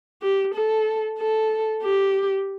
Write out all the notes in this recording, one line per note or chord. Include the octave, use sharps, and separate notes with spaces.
G4
A4
A4
G4